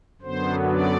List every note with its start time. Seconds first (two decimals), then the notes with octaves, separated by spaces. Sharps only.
0.21 F#2 D3 F#3 B3 C5
0.69 D5